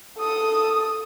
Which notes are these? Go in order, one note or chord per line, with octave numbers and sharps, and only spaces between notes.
A4 D#6